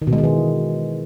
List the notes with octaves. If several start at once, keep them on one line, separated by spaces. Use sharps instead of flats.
D#3
B2
G#3
D#3
E3